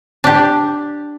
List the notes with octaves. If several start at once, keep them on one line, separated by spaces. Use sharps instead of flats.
D4 G4